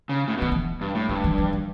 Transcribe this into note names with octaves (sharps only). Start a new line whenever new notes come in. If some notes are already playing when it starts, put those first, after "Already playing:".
C#3
A2
B2 D3
E3
G2
A2
G2 F#3
E3
E3
E3